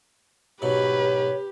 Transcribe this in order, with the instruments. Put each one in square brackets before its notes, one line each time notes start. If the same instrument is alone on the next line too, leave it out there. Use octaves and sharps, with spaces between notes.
[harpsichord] G#2 B2 F#3 [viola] G4 [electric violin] B4 [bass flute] C#5